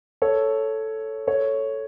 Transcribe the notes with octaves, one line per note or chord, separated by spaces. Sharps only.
A4 C#5
A4 C#5